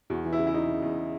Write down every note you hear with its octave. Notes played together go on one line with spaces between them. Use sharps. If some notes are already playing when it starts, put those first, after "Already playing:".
E2 F#4
E3
E4
C#3
E4
E2 D#4
C#3
E2